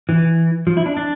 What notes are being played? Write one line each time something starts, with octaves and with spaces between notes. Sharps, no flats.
E3
F3
E4
D4
D4